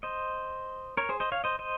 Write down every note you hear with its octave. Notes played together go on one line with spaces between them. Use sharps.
C5 D#5
A#4 C#5
G#4 C5
C5 D#5
C#5 F5
C5 D#5
C5 D#5